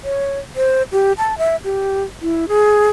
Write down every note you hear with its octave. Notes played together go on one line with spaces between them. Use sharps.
C#5
C5
G4
A5
E5
G4
E4
G#4